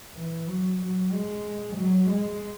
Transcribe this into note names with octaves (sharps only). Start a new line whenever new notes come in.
E3
F#3
F#3
G#3
F#3
G#3